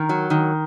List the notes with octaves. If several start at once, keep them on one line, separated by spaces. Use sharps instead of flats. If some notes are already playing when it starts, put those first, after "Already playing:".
Already playing: D#3 A#4
F#3
D#3